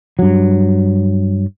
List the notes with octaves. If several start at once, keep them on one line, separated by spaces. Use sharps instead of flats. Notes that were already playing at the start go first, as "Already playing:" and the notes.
G2 F#3